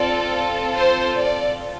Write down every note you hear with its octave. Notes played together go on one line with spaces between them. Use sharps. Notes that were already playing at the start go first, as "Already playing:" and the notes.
Already playing: C4 F4 A4 D5
C5
D5